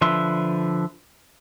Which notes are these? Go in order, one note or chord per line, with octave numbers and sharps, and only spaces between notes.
D3 F3 B4 E5 C6